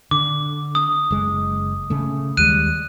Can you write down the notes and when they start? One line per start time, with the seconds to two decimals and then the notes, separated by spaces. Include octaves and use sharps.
0.11 D3 D6
0.75 D#6
1.11 F#1 G#3
1.90 C#3 A3
2.37 D#2 G3 G#3 F#6 D#7